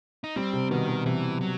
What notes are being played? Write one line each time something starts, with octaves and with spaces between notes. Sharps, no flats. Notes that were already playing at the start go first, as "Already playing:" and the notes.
D#4
G3 C4
C3
B2 D#3
B2
C3 E3
F#3